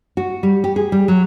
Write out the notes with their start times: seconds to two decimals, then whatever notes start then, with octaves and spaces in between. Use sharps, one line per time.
0.17 F#4
0.43 G3
0.64 G4
0.76 G#4
0.92 G3
1.08 F#3